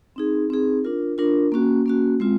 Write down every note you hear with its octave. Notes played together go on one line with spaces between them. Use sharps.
C4 D#4 G#4
C4 D#4 G#4
D4 F4 A#4
D4 F4 A#4
A#3 C#4 F#4
A#3 C#4 F#4
G#3 C4 F4